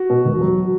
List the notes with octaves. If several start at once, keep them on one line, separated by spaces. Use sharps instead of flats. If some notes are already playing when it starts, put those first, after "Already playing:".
Already playing: F#4
B2
E1
F#3